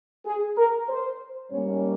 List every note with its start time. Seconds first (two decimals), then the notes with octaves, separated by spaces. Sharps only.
0.26 G#4
0.58 A#4
0.89 C5
1.51 G#2 G3 A#3 C#4 C#5